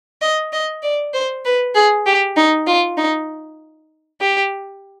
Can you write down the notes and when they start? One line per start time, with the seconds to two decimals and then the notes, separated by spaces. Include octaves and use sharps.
0.22 D#5
0.53 D#5
0.83 D5
1.14 C5
1.45 B4
1.75 G#4
2.06 G4
2.37 D#4
2.67 F4
2.97 D#4
4.21 G4